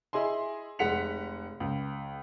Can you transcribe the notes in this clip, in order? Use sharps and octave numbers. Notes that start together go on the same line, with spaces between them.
E4 G#4 D#5 G#5 C6
F1 G#3 F#5 B6 C#7 F7
C#2